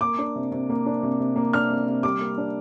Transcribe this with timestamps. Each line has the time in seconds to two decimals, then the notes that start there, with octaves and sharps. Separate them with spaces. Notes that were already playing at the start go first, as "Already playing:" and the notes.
0.01 A#3 D6
0.19 D4
0.36 C3
0.52 C3
0.69 A#3
0.86 D4
1.03 C3
1.20 C3
1.36 A#3
1.53 D4 F6
1.70 C3
1.88 C3
2.03 G3 D6
2.21 A#3
2.38 D4